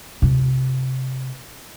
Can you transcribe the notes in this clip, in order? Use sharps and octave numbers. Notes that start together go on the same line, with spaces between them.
C3 F4